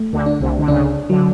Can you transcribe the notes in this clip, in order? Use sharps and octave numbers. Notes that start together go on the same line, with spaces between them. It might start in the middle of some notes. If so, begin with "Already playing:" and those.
Already playing: A3
D2 D3
D4
C2 C3
D3
C#2 C#3 D4
D3 F#3